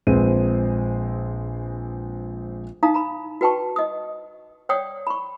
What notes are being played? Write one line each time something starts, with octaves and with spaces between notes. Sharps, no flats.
A#1 G#3 C4 B4 D#7
D#4 F5 A#5 D#6
A#5 B5
F#4 B4 G5 A5 C#6
D#5 D#6
C#5 D5 F#5 G5 D#6
B5 C#6